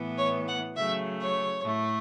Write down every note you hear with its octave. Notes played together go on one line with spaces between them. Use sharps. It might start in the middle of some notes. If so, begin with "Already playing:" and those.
Already playing: A2 E3 B3
C#5
F#5
C#3 F#3 A3 E5
C#5
A2 A3